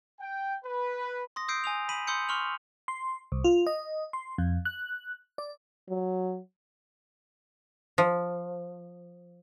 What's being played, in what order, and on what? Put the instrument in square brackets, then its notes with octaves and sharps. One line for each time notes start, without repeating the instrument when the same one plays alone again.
[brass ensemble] G5
B4
[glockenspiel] C6 D#6 A#6
D#6 E6 G6 C7 D7
G#5 D#6 F7
B5 B6 D#7 F#7
B5 C6 D#6 E6 G6 C#7
C6 C#6 F6 F7 F#7
[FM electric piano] C6
C2
F4
D#5
C6
F2
F#6
D5
[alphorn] F#3
[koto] F3